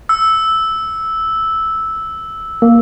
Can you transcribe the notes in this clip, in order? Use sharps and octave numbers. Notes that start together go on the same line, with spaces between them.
E6
A#3